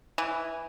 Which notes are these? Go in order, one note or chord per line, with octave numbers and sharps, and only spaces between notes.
E3